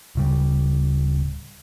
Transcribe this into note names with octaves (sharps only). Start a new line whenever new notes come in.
D1 C#3 G3